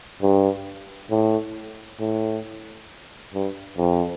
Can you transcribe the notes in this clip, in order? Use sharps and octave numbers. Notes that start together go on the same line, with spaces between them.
G2
A2
A2
G2
F2